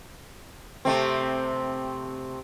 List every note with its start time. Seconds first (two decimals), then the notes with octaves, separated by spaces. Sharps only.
0.85 C3 A3 C4